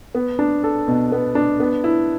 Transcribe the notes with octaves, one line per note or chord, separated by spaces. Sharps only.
B3
D4
A4
B2
B3
D4
B3
E4